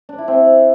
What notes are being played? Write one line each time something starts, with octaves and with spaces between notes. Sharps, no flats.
D4
E4
C4